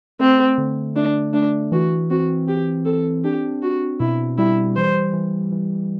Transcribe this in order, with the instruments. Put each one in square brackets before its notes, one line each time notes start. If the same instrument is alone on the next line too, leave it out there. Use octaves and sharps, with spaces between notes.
[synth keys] A3 [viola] C4
[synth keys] D3
[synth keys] A3 [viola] D4
[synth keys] A3 [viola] D4
[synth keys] E3 [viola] F#4
[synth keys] C4 [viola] F#4
[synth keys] C4 [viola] G4
[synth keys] C4 [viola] A4
[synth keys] D4 [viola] G4
[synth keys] D4 [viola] F#4
[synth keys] B2 [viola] E4
[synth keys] G3 [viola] E4
[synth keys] E3 [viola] C5
[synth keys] E3
E3